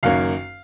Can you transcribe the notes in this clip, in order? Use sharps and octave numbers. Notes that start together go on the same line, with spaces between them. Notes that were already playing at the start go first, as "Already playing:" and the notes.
F#1 F#2 D#3 A#3 C#4 F5